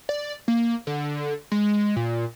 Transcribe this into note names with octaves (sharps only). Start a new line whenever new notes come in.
D5
A#3
D3
G#3
A#2